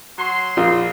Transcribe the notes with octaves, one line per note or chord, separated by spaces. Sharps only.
F#3 F#4 C6
A#1 F4